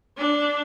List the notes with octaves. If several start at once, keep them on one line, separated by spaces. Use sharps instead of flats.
D4